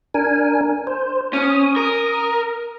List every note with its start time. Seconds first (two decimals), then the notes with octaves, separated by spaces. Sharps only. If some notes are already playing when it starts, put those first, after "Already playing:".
0.14 D4 A#4 G#5
0.87 C5
1.33 C#4 D#6
1.77 A#4